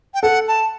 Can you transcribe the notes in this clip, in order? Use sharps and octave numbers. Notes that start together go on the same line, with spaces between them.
G5
A4 F#5
A5